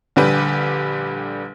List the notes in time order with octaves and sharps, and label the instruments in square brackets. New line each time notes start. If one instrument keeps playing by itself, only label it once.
[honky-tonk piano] A#1 D3 G3 G4 B4